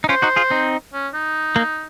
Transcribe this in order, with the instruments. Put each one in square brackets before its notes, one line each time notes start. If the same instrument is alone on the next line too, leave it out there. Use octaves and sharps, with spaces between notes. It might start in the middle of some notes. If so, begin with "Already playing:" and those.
[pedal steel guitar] D#4
[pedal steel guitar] C#4 F4 [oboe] C5
[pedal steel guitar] D#4 F#4
F4 G#4
C4 D#4
[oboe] C#4
D#4
[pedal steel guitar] A#3